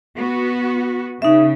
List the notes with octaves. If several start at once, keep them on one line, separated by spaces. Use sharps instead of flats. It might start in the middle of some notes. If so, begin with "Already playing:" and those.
B3 F#4
C#3 D#4 E5